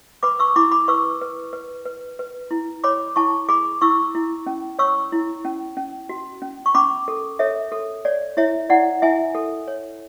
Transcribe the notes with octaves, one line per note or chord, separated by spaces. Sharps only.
B4 B5 D6
C#6 E6
E4 B5 D6
B5 D6
B4 C#6 E6
B4
B4
B4
B4
E4
C#5 B5 D6
E4 A5 C#6
G#4 B5 D6
E4 C#6 E6
E4
C#4
C#5 C#6 E6
E4
C#4
C#4
F#4
C#4
C#6
C#4 B5 D6
A4
A4 C#5 E5
A4
C#5 D5
E4 C#5 E5
E4 D5 F#5
E4 E5 G#5
A4
C#5